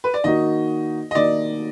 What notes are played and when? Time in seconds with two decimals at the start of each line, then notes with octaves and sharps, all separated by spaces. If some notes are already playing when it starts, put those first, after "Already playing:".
0.04 B4
0.14 D5
0.24 D#3 A#3 D#4 F#4 D#5
1.11 D#5
1.15 D#3 A#3 D#4 F#4 D5